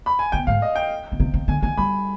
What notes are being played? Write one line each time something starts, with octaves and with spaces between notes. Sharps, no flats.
B5
G#5
B2 G5
G#2 F5
D#5
G5
D3
C3
C3
D3 G#5
D#3 G#5
G3 B5